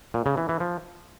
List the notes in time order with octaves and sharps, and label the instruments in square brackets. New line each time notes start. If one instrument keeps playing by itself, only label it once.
[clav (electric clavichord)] A#2
C#3
E3
E3
F3